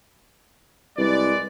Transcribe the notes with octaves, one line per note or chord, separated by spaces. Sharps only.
C2 G#3 B4 D5